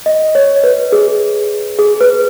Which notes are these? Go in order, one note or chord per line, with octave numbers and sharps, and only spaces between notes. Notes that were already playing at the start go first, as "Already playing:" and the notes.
D#5
C#5
B4
G#4
G#4
B4